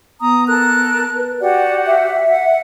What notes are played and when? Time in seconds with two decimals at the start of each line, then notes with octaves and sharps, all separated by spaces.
0.21 B3 A#5 D#6
0.47 A4 A#4 F#6
1.16 B4
1.40 F#4 G4 D5 F#5
1.87 E5
2.27 F#5